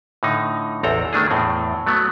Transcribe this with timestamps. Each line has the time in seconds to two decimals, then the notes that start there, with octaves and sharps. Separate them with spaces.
0.23 A2 D3 D#4
0.83 A1 E2 C4 A4 A#5
1.13 D#3 A3 D4 G#4
1.30 E2 A2 C4
1.86 F#3 A3 B3